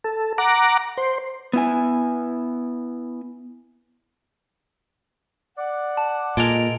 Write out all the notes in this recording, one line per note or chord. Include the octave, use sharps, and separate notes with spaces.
A4
F#5 A#5 D6
C5
B3 E4 G#5
D5 F#5
A5
A#2 G#3 A4 A#4 D7 F7